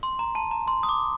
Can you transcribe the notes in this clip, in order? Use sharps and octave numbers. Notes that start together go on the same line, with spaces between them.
C6
A#5
A5
A#5
C6
D#6
D6